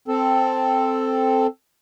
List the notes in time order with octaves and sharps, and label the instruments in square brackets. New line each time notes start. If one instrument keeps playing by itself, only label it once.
[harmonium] C4 A4